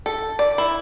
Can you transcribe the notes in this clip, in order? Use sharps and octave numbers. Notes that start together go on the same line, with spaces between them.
A4
D5
E4